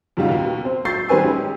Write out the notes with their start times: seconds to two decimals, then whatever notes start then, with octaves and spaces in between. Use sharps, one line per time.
0.17 F2 C#3 G3 D#4 F4 F#4
0.28 D#2 B2
0.65 C4
0.85 C#6 E6 G6 A6 C7
1.08 D#3 G3 C4 B4 G#5 E6
1.23 G#3 C#4 D#4 G4